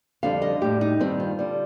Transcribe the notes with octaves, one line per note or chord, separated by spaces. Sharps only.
F2 D3 G3 F5
D#5
A2 G3 G4
D#4
G2 D#3 G3 C4
F4
D3 G3